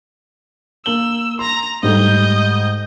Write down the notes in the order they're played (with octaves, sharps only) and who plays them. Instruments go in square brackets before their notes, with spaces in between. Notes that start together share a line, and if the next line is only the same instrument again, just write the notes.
[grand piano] A#3 F#7 G7 [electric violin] E6
[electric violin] A#5 A#6 [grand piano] C6
[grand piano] G#2 G3 A3 [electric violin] D#5 G6